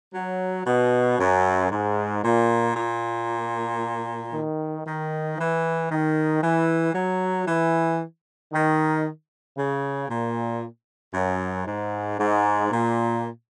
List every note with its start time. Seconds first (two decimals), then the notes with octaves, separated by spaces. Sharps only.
0.13 F#3
0.66 B2
1.19 F#2
1.71 G#2
2.23 A#2
2.76 A#2
4.33 D#3
4.86 D#3
5.38 E3
5.91 D#3
6.42 E3
6.95 F#3
7.47 E3
8.53 D#3
9.57 C#3
10.09 A#2
11.14 F#2
11.67 G#2
12.19 G#2
12.71 A#2